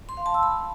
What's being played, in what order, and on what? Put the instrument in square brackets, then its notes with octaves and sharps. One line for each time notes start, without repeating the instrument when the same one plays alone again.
[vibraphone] C6
F5
A5
E6
B5